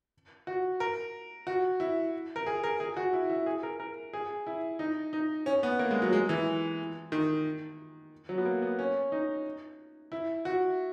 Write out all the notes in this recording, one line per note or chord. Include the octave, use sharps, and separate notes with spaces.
F#4
A#4
F#4
E4
A#4
G#4
A#4
G#4
F#4
E4
E4
G#4
A#4
A#4
G#4
E4
D#4
D#4
C#4
B3
A#3
G#3
F#3
G#3
E3
D#3
F#3
B3
A#3
B3
C#4
D#4
E4
F#4